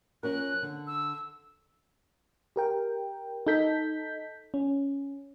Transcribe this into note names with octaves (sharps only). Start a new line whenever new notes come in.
F3 C#4 A#4 F#6
D3
E6
G4 A#4 G5
D#4 A4 G6 B6
C#4